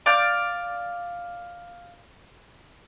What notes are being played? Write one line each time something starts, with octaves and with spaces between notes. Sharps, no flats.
D5 F5 G6